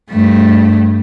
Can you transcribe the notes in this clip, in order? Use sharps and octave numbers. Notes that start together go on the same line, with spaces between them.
G2 A3